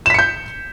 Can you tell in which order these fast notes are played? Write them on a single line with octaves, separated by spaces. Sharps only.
E7 B6 C#7 G6